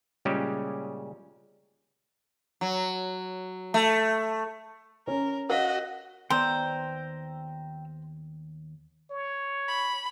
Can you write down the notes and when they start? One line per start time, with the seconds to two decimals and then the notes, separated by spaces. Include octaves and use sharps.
0.25 A#2 C#3 G3 G#3 C#4 G4
2.61 F#3
3.74 A3
5.07 C#4 A#4
5.50 F#4 A#4 D#5 F5
6.30 D#2 B3 C5 D5 G5 A#5 E6
9.11 C#5
9.68 B5